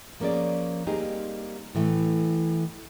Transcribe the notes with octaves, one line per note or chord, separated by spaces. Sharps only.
F3 A#3 C#4 G#4 D5
G3 A#3 C4 D#4 G4 G#4
A2 E3 A3